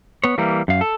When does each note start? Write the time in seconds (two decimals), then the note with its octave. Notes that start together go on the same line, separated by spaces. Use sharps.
0.24 B3 C#5
0.38 E3 G3 A#3
0.68 F#2 F5
0.81 A4